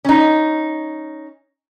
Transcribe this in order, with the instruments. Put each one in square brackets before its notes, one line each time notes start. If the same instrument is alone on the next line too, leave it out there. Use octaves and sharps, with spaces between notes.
[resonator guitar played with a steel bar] C#4 D#4